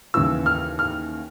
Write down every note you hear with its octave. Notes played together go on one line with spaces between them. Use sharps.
D#2 C#3 E3 E6
F6
F6